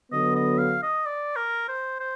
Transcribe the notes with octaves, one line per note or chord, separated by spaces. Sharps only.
D3 F#3 B3 D#5
D#5
F5
D#5
D5
A#4
C5
C5